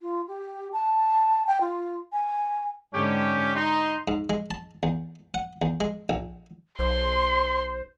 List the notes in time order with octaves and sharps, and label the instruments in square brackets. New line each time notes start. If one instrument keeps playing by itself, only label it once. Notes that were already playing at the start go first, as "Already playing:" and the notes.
[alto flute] F4
G4
A5
G5
F4
G#5
[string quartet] G#2 D3 [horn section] C#4 G4
[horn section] D#4 [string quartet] C6
[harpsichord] G#2
G#3
A5
E2
F#5
E2
G#3
A#1
[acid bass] B1 [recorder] C5 [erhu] C6